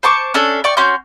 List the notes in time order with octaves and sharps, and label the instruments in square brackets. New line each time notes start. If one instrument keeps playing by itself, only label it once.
[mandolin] C5 A5 C#6 D6
C#4 D4 A4
D5 G5 C#6
C#4 F#4 C6 G6